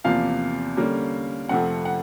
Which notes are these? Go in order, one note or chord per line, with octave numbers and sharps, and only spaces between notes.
E2 C3 F3 A#3 F5
D3 G3 A#3 C#4
F2 C3 F3 A3 C4 F#5
F#5